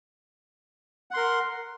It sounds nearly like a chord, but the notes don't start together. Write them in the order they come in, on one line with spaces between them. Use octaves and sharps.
F#5 C6 A#4